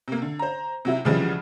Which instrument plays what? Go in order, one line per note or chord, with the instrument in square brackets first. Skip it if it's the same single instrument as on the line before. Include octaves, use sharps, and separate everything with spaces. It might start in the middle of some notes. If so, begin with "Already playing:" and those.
[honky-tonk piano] C3 A#3
D3
C5 A#5
C3 F#3 E4
C2 C#3 E3 F3 G3 G#3